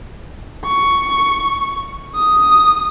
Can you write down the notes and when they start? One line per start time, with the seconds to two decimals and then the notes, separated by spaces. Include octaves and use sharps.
0.65 C#6
2.15 D#6